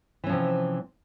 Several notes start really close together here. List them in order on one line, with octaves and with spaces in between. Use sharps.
E3 C#4 F3 C3